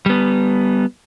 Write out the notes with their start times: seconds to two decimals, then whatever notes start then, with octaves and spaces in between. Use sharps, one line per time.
0.06 G3 B3